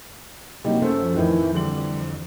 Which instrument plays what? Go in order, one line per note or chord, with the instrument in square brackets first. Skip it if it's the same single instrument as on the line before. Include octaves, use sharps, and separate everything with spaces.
[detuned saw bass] C3 [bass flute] F#3 [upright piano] G3 D#4 [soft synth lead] A#3
[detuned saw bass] F#2 [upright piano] A3 C#4 C5 [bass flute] A4
[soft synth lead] F3
[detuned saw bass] F2 [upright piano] A2 D#3 [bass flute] E3
[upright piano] D3 F#7 [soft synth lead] E3 [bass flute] G3